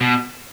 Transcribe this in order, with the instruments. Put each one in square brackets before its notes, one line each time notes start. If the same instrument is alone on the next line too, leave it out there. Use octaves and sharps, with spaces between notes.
[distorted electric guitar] B2